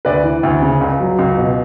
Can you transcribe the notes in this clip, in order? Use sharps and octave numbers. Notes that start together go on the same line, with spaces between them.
D2 B4 D5
E3
D2
C#3
C#2
F#3
C#2
B2